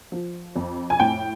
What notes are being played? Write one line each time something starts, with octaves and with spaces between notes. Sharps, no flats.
F3
F2
G#5
A2 G5